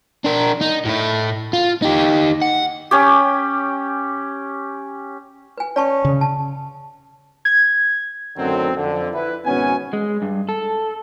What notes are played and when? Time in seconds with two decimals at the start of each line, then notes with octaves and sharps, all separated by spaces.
0.25 D4 A#4
0.61 D#4
0.85 A2 E4
1.53 F4
1.82 D#4 G4
2.41 F#5
2.91 C#4 G4
5.58 B4 G#5
5.76 C#4 D5 A5 C#6
6.05 C#3
6.21 A5
7.45 G#6
8.37 F#2 A2 D3 D#3 F#3 C4
8.76 F2 D3
9.13 E4 B4
9.46 G#1 B2 B3 C#4 G#5
9.93 G#3
10.22 G2
10.49 A4